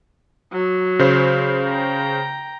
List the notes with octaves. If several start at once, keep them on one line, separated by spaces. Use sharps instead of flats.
F#3
C#3 C5 C7
G5 A#5